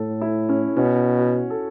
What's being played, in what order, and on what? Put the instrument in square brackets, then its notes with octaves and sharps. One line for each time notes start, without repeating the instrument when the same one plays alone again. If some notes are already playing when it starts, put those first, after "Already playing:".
Already playing: [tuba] A2 [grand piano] A4
[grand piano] E4
C#4
[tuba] B2 [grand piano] C#4
[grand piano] F#4
A4